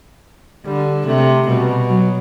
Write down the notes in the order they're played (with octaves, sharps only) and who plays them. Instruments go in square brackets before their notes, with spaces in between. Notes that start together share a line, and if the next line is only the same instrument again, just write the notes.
[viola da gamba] D3 [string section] G3
[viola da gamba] C3 [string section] A3
[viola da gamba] B2 [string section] G3
[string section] F#3